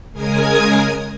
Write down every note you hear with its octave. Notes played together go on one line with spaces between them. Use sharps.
C#3 G#3 A#4 G#5 D#6 G#6